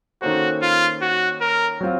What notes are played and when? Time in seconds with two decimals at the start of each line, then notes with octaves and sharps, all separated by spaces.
0.22 D#3 A#3 C#4 F#4 A4 C5
0.62 F4
1.02 F#4
1.41 A#4
1.81 F#3 C4 F4